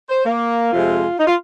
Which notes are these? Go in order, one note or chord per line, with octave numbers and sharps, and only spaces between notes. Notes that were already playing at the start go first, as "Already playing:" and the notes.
C5
A#3
F2 C3 G#3 F4
D#4
F4